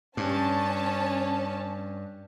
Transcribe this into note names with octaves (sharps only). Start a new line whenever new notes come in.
G2 C#4 A5